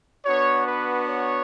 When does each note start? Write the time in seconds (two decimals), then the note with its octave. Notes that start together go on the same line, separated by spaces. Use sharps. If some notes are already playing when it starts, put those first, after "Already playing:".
0.25 B3 D4 F#4 C#5
0.66 B4
1.07 C#5